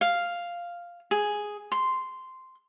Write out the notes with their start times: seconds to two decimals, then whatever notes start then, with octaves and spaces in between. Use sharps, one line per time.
0.01 F5
1.11 G#4
1.72 C6